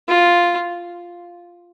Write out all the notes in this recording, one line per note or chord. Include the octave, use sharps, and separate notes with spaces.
F4